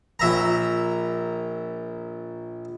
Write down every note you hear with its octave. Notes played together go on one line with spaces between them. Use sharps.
A#1 E5 A#5